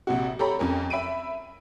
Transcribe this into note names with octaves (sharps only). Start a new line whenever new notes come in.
A#1 C3 F#4
G4 A4 C#5 A#5 B5
F2 C#4 A#4
E5 B5 D7 D#7